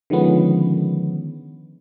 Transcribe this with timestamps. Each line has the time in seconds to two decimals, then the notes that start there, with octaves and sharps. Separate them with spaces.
0.10 D3 D#3 F3 G#3 B3 C#4